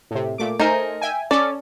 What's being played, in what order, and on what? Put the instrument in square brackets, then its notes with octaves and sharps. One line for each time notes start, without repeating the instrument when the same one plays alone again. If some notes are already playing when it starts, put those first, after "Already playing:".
[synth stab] A2 C3
A#2 A3 D6
[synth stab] A3 C5 G#5 [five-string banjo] D#4 A#4
[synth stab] E5 G5 G#5
[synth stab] C#4 A4 [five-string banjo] D5